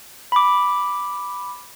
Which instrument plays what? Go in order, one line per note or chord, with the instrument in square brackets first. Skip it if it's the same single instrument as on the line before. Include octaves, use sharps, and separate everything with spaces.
[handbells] B5 D6